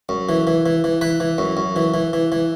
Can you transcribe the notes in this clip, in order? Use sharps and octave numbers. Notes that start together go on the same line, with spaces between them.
F#2
E3
E3
E3
E3
E3 B4
E3
F#2
F#2
E3
E3
E3
E3